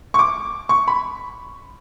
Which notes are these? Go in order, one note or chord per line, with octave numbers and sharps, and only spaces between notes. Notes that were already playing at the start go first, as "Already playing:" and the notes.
C#6
D6
C#6
B5